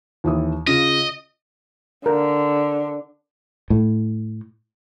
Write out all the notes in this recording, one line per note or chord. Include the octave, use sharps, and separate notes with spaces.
D#2 E3 D#6
C#3 C#4 F4 D#5
D3 A#4
A2